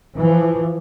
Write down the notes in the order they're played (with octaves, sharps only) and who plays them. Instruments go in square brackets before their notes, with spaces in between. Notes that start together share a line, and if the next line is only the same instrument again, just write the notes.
[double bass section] E3 F3